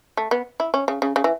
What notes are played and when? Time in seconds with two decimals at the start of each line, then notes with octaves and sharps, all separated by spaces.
0.17 A3
0.31 B3
0.60 E4
0.74 C#4
0.88 C#3
1.02 C#3
1.16 C#3
1.24 E3